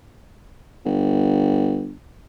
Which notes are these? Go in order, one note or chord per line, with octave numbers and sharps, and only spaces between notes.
G1